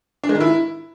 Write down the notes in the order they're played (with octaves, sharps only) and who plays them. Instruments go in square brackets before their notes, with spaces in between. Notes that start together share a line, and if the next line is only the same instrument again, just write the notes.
[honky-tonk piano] D4
G#3
D#3
E4